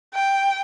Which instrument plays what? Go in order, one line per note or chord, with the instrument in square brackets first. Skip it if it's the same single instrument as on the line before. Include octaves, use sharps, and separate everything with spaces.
[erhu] G5